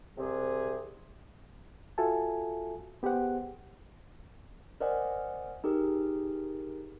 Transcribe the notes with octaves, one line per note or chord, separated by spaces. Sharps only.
C2 C3 G#4
F4 F#4 A4 E5 G#5 A5
B3 G4 G#4 C5 F#5
A#4 C5 D5 D#5 F#5 G#5
D#4 G4 G#4 A#4